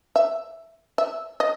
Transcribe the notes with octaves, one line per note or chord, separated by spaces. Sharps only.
E5
E5
D#5